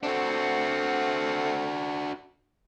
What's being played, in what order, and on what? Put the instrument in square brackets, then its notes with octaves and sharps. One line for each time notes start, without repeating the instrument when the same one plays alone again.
[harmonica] A3 C4 F#5 [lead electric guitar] D4 F#4